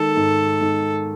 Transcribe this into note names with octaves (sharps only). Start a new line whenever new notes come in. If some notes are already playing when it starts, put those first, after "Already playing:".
Already playing: D#3 G#3 A4
G#2
G#2